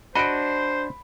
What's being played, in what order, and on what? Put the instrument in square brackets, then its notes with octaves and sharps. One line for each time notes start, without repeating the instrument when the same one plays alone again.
[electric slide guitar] D4 [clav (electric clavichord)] F#4 D#5 [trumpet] C5 [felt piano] B5 D7